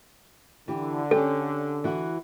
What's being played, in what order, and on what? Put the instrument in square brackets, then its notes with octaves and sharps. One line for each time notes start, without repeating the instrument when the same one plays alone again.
[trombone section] D3 [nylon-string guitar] E3 G4
[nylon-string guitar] C#4 G4 [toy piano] A4
[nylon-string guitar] E3 F#4